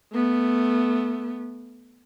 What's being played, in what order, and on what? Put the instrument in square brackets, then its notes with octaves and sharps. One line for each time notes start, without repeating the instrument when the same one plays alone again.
[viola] A3 B3